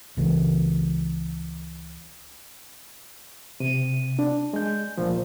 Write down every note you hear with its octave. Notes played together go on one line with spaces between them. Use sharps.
C#2 C#3 E3
C3 D#7
D4
G#3 G6
D2 A#2 F3